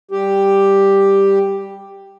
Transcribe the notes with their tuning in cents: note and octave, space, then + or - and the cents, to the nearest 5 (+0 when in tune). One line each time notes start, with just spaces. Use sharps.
G3 +0 G4 +5